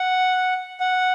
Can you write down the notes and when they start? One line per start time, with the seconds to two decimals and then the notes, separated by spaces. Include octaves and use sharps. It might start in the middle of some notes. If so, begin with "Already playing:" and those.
Already playing: F#5
0.80 F#5